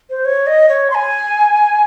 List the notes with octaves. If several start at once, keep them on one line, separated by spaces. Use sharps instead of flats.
C5
C#5
D#5
C#5
C6
G#5